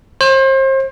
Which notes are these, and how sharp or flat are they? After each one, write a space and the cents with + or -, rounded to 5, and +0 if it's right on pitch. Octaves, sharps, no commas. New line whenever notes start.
C5 +35